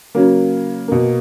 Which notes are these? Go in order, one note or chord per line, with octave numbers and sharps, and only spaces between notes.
C#3 F#3 A#3
B2 A#3